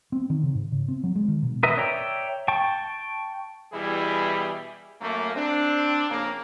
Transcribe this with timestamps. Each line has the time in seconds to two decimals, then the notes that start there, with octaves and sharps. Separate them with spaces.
0.12 C4
0.30 D#3
0.43 C#3
0.55 G#2
0.72 C#3
0.88 C4
1.04 F#3
1.15 G#3
1.28 D#3
1.43 B2
1.63 A#4 B4 D#5 E5 A#5
1.77 C#5 D5 E5 G5 A#5
2.48 G5 A5 C#6
3.72 B2 E3 G3 E4 G#4
5.01 F#2 A3 A#3
5.36 C4 D4
6.10 F2 C#3 A#3